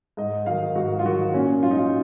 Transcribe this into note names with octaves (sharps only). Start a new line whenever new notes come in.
G#2 D#5
D#3 F#3 F5
G#2 F#4
F4
D#3 F#3 F#4
A#2 C#4
F#3 F4
D#4
F4